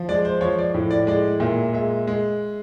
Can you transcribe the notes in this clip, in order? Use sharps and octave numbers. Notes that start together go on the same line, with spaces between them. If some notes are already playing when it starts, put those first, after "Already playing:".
Already playing: F3
G#3 D5
C5
F3 C#5
D5
A2
D5
G#3 D5
A#2 E5
G#3 E5
G#3